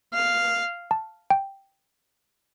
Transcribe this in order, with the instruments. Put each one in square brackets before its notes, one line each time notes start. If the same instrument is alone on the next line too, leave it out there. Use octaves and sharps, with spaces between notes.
[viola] F5
[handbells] A5
G5